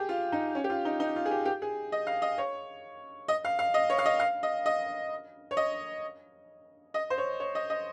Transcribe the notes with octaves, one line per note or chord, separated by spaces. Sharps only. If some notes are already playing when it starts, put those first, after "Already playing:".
Already playing: G4 G#4
F4
D#4
C#4
G4
F4
D#4
D#4
F4
G#4
G4
G4
G#4
D#5
F5
D#5
C#5
D#5
F5
F5
D#5
C#5
F5
D#5
F5
D#5
D#5
C#5
D#5
D#5
C5
C#5
C#5
D#5
D#5